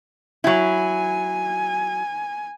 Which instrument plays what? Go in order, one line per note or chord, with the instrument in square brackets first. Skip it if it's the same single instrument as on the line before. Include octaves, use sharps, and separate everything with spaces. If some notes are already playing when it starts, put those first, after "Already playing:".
[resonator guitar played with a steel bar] F#3 E4 [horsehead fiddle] G#5